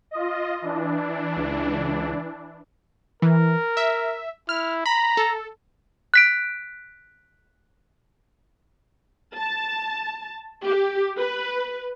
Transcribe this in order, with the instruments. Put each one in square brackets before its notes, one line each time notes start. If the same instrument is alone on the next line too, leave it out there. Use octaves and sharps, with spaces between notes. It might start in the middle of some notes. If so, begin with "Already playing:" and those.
[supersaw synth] F4 D#5
E3 D4
[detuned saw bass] C#2
[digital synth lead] E3 [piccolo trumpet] A#4
[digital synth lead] E5
[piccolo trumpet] E4 [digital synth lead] F6
[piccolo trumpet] A#5 [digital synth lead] B5
[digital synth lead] A4
[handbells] F#6 B6 D7
[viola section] A5
G4
B4